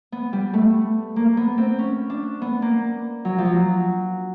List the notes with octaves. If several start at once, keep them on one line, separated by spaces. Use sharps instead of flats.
B3
G3
A3
A#3
B3
C4
C#4
D4
B3
A#3
F#3
F3
F#3